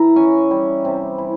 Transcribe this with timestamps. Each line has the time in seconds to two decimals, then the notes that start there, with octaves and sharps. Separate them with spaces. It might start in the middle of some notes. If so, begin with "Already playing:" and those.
Already playing: E3 E4 A#5
0.16 C#4 G#5
0.51 G3
0.85 C3
1.18 E4